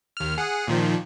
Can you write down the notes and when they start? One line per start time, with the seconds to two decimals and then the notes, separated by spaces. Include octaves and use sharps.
0.17 D#2 F6
0.38 G#4 F#5
0.67 A#2 D#3 F3